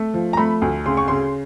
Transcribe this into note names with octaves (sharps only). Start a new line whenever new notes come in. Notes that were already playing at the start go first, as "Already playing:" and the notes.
Already playing: A3
F3
A#5
A3 B5
D2
C#3 C6
C#6
C#3 C6